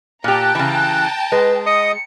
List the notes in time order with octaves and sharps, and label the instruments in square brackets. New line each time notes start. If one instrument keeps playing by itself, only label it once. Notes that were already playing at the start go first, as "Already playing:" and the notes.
[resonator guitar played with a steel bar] A#2 G4 [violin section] G5 A5 A#5 [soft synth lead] F#6
[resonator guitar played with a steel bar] C#3 E3
[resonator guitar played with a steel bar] G#3 [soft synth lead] B4
[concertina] D#5 D#6 [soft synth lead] C#7